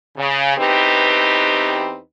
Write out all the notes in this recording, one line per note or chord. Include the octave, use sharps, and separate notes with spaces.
C#3
E2 C4 D#4 G4 B4